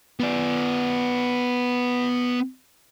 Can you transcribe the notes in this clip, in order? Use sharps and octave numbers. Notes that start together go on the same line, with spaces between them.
B3 D5